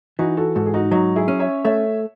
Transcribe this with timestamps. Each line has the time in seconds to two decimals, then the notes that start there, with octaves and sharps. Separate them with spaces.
0.19 E3 D#4 F#4
0.37 F#4 A4
0.55 G#2 F#4 A4
0.66 G#4
0.74 D#4 F#4
0.91 F#3 D#4 F#4
1.16 E4 G#4
1.28 C#4
1.40 C#5 E5
1.64 A3 C#5 E5